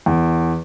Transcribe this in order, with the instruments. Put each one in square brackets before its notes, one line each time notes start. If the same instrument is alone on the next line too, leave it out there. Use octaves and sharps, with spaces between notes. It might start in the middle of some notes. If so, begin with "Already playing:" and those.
[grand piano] E2